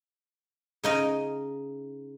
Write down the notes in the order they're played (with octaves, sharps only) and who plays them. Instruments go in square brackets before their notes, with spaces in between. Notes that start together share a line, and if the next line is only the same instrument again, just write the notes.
[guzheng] C#3 D#4 D#5